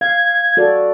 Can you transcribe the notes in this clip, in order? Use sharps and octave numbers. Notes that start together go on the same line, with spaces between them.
F5 G#6
F#4 A4 D5